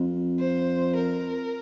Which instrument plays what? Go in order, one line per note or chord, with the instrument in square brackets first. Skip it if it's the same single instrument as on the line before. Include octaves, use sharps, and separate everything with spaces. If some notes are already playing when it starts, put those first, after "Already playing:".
Already playing: [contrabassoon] F2
[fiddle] C5
A#4